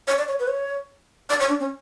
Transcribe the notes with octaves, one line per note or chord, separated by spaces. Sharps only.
C#5
D5
C#5
B4
C#5
D5
C#5
D4
C#4